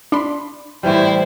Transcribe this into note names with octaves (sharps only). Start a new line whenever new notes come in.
D4 B5 C6
A2 E3 G3 E4 C5